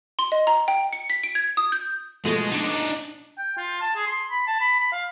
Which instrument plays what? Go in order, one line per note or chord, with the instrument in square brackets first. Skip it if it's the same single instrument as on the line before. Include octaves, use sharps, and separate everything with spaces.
[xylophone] C6
D#5
A#5
G5
C#7
B6
D7
G#6
D#6
G6
[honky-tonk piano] B2 F3 A3 [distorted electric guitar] G#3
[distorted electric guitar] D4 D#4
[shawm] G5
F4
A5
G#4
C6
B5
A5
B5
B5
F5